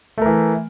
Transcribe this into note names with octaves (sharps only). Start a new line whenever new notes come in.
E3 A3 A#4